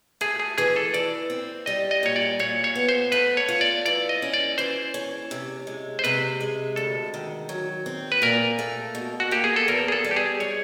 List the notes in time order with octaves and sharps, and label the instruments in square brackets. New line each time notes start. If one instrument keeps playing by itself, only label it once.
[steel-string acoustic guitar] A3 [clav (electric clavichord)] G#4
[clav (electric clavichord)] G#4
[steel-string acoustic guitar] E3 [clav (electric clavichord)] G#4
[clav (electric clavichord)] A4
[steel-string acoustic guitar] E3 [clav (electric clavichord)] D5
[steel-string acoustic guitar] C4
[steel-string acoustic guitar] G3 [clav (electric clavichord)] D#5
[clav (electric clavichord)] D#5
[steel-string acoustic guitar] A#2 [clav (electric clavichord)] C#5
[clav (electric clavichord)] D5
[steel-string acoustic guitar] A#2 [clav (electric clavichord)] C#5
[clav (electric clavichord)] C#5
[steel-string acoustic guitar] B3
[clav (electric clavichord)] C5
[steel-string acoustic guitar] A3 [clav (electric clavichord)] B4
[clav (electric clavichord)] C#5
[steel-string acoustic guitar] F4
[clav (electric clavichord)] D5
[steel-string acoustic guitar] E3 [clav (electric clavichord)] D5
[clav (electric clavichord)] D#5
[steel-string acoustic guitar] C#4
[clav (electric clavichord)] D5
[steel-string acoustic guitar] E3 [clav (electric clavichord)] C5
[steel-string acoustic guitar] C#4
C3
G#3
[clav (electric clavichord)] C5
[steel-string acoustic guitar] C3 [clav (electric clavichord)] B4
[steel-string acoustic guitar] G#3
[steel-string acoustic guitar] D2 [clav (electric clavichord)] A4
[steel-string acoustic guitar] D#3
F#3
C4
[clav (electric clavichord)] B4
[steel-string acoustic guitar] A#2 [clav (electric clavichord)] A#4
[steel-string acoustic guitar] A3
B2
[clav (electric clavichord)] F#4
[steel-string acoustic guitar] A#3 [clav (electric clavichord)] G4
[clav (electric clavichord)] G#4
A4
[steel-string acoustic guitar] E2 [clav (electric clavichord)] A#4
[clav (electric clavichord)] G#4
A4
[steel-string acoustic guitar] G3
[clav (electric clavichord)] G4
G#4
[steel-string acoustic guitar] G#3 [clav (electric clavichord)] C#5